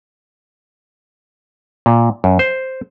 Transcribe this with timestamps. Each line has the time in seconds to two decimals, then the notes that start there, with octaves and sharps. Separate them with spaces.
1.86 A#2
2.24 F#2
2.39 C5